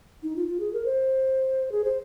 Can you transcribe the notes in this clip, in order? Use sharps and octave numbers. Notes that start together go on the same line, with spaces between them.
D#4
F4
F4
G#4
A#4
C5
G#4
C5